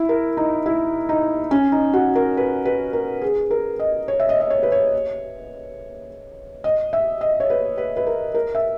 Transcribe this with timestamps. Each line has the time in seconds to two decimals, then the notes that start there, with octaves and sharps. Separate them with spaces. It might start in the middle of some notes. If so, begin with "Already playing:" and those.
Already playing: E4
0.09 A#4
0.37 D#4
0.66 E4
1.09 D#4
1.51 C#4
1.72 D#4
1.93 F#4
2.15 A#4
2.37 B4
2.65 B4
2.93 A#4
3.22 G#4
3.51 A#4
3.80 D#5
4.08 C#5
4.20 E5
4.29 D#5
4.40 D#5
4.50 C#5
4.63 B4
4.72 C#5
6.64 D#5
6.93 E5
7.21 D#5
7.40 C#5
7.50 B4
7.78 B4
7.97 B4
8.07 A#4
8.34 A#4
8.55 E5